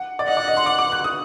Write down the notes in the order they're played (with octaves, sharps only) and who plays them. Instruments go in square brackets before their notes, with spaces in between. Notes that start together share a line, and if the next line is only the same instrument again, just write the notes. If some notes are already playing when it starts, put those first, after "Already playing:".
Already playing: [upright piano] F#5
D5
[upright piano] D#5 [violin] F#5
[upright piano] D5
D#5
C6
D6
D6
F#6
D#6